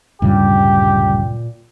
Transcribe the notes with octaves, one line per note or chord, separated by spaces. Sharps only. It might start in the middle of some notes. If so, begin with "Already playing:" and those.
D1 G2 A#2 C#3 G3 G4